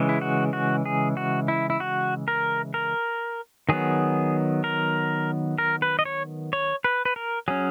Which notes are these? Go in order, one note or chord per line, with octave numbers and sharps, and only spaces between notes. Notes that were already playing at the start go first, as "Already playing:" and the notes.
Already playing: C#3 E3 G#3
E4
F#4
F#4
G#4
F#4
E4
E4
F#4
A#4
A#4
D#3 F#3 B3 G#4
A#4
A#4
B4
D#5
C#5
C#5
B4
B4
A#4
F#3 C#4 G#4